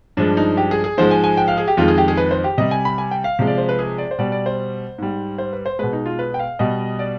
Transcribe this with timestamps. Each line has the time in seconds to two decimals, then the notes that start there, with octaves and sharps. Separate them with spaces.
0.17 G2 F3 G#3 D4
0.37 D#4
0.57 G4
0.71 G#4
0.84 G#4
0.97 G#2 F3 G#3 C5
1.11 G#5
1.24 G#5
1.37 G5
1.48 F5
1.58 G#4
1.68 G4
1.77 F2 D#3 G#3 F4
1.88 G#4
1.98 G4
2.08 G#4
2.17 B4
2.31 C5
2.44 G4
2.58 C3 G3 D#5
2.71 G#5
2.85 B5
2.98 G#5
3.11 G5
3.24 F5
3.39 C3 F3 G#3
3.47 D5
3.58 C5
3.69 B4
3.79 G#4
3.98 D5
4.11 C5
4.18 B2 G3 D5
4.32 D5
4.46 C5
4.98 G#2 G3
5.38 C5
5.53 B4
5.66 C5
5.79 B2 G#3 B4
5.93 D#4
6.06 F4
6.19 B4
6.34 G5
6.39 F5
6.59 B2 G3 D#5
6.99 D5